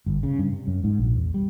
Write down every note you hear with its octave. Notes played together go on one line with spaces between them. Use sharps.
G1
C#3
G2
C3
F#2
G#2
A#1
E2
G3